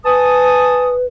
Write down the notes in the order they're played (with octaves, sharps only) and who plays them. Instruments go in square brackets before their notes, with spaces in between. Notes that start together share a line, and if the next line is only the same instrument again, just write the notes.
[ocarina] B4 [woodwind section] G#5 A5 D#6